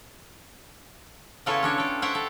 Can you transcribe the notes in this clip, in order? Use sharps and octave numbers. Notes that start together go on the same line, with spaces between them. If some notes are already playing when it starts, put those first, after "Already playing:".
C#3 B3 E4 F4 A4 C#5
C#4 D4 C#5
A4 G5
C5 C#5 E5 F#5 G5
A4